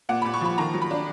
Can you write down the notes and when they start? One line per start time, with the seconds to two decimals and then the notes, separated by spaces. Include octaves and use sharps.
0.09 A#2 F#5
0.22 A#2 B5
0.34 C#6
0.41 F3 B5
0.58 D#3 A#5
0.74 F#3
0.82 B5
0.91 D4